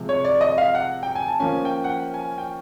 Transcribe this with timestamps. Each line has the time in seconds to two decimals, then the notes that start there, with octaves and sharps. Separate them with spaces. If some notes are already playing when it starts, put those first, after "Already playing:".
Already playing: C3 F3 G#3
0.09 C#5
0.25 D5
0.41 D#5
0.58 F5
0.75 F#5
1.03 G5
1.15 G#5
1.27 A5
1.40 F3 A#3 C#4 G#5
1.65 G5
1.84 F#5
1.89 G5
2.14 G#5
2.38 G5